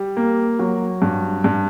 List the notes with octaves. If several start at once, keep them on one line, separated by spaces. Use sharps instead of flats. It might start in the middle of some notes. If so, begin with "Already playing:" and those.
Already playing: G3
A#3
F#3
G2
G2